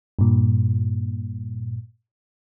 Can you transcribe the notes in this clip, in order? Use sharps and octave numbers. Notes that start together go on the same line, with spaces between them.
G2 A#2